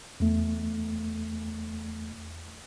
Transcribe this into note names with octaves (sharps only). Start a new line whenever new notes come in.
E2 A3